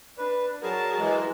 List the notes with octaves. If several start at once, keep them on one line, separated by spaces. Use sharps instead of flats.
D4 B4
F#3 G#4 A#4 A5
E3 G#3